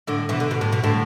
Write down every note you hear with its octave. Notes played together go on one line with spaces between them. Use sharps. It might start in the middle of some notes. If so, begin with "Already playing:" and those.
A2 D3
B2 E3
D3
B2
A2
B2
A2 D3